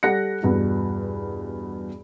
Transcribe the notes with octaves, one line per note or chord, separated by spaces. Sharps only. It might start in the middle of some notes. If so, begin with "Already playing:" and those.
G3 A4 F#5 F#6 A#6 C#7
E2 G2 B2